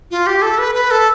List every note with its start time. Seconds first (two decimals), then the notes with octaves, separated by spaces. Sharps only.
0.11 F4
0.27 G4
0.42 A4
0.58 B4
0.75 B4
0.91 A4